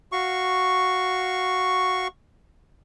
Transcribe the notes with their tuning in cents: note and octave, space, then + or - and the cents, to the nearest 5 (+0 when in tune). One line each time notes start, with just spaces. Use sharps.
F#4 +0 F5 +0 C#6 +0